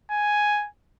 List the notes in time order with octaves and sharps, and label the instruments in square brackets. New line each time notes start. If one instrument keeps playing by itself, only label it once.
[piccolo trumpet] G#5